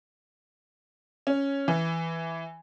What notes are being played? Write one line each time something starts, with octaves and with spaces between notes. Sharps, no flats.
C#4
E3